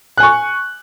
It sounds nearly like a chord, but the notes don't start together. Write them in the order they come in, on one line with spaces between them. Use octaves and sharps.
F#6 G#5 C#6